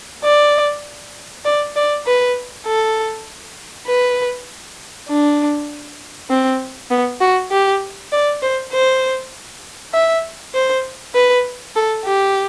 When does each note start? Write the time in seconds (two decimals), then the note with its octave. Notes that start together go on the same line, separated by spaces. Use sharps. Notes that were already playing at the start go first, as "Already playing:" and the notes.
0.24 D5
1.45 D5
1.76 D5
2.06 B4
2.66 A4
3.88 B4
5.08 D4
6.30 C4
6.91 B3
7.21 F#4
7.51 G4
8.12 D5
8.42 C5
8.72 C5
9.93 E5
10.54 C5
11.15 B4
11.76 A4
12.05 G4